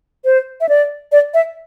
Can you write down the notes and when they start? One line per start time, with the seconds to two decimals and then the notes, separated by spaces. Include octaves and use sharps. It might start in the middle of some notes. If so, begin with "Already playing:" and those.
0.25 C5
0.61 E5
0.69 D5
1.12 D5
1.34 E5